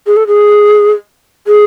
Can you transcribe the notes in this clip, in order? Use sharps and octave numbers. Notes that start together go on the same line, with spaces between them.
G#4
A4
G#4
G#4